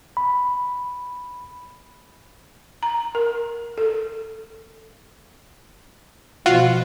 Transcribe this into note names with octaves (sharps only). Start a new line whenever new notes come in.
B5
A#5
A#4
A4
B2 F3 F4 F#4